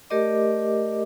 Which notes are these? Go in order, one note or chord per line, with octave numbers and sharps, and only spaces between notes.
A3 G4 A#4 D5 D#5 D6